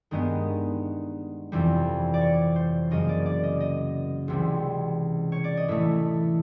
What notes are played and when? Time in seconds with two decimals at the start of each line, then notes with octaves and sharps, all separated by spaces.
0.11 G2 D#3 G#3 B3 D#5
1.52 F2 C3 E3 G3
2.14 D5
2.21 C#5
2.56 C5
2.91 F#2 C#3 F#3 A#3 D#5
3.09 D5
3.26 D5
3.43 D#5
3.60 D#5
4.28 C#2 C3 E3 G3
5.32 C#5
5.44 D5
5.57 D#5
5.68 A2 E3 A3 E5